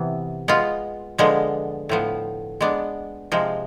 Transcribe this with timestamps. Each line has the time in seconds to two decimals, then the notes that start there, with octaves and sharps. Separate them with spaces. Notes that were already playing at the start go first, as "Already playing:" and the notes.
Already playing: C3 E3 B3
0.48 G#3 B3 F4
1.18 D3 F3 G#3 B3
1.89 A2 F3 B3
2.61 G#3 B3 D4
3.32 C3 F3 G#3